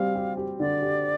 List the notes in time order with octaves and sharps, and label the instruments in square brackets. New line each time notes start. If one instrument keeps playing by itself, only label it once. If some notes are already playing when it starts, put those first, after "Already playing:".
Already playing: [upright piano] G3 C4 [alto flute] F5
[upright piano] G4
G4
[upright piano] D3 [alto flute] D5
[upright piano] G4